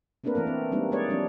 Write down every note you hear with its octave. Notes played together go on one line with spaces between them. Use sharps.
A3 A#3 C4 D4 A#4 B4
E3 A3 B3 A#4
C4
G3 G#3 A#3 C4 D4 D#4
G#3 A#3 G#4 B4 C#5 D5
F3 G3 C4 D4